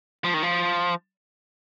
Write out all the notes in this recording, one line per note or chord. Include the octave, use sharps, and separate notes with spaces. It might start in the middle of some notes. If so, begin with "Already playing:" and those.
F3
D#3
F3